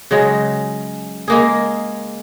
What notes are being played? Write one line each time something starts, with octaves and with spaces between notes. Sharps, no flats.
C#3 F#3 G#3
G#3 A#3 G#4